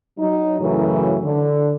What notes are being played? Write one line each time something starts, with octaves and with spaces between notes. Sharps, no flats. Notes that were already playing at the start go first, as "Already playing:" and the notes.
F#3 D#4
F#2 A2 C#3 E3 F#3
D3